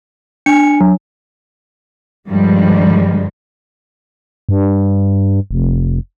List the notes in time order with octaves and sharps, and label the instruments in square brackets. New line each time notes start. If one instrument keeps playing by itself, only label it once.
[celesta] D4 G#5 [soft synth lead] C#7
[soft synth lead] F#3
[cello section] G2 D3 D#3 F3 G3 G#3
[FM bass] G2
F1